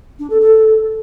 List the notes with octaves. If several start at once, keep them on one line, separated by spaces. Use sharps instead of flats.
D4
A4
A4